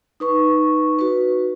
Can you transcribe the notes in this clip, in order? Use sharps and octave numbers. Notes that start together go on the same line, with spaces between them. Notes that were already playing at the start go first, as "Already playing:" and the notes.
D#4 B4 C#6
F#4 B4